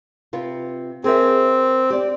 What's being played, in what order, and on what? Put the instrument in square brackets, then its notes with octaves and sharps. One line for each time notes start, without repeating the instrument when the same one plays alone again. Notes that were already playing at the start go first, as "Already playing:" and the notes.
[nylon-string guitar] C3 F4 B4
[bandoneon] C4 [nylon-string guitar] G#4 A#4 E5
[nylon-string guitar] G4 D5